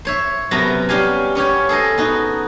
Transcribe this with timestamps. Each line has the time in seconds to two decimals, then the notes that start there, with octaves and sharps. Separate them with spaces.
0.05 C5 C#5 E5
0.51 F#2 C3 B3 F#4 A5 A#5
0.89 G3 C#4 G4 F5 G#5
1.35 B3 C#4 G4 C#5
1.69 G#4 A4 C5 D#5
1.98 B3 D#4 F#4